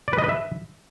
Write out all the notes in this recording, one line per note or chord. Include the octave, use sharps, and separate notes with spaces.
D5
B4
D#5
B4
E5